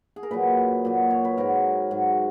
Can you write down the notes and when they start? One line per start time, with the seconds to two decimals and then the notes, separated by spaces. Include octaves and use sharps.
0.16 G#4
0.23 A#4
0.31 A#2 F#3 B4
0.85 A#2 F#3
1.10 C#5
1.25 B4
1.37 G#2 F#3 A#4
1.91 G#2 F#3